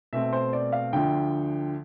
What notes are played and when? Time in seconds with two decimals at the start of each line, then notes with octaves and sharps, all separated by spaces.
0.13 B2 A3 C4 E5
0.33 C5
0.53 D5
0.72 F5
0.93 D2 D3 F3 G5